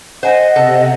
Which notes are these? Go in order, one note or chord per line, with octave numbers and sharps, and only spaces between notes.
C5 D#5 F#5 G#5
C3 A4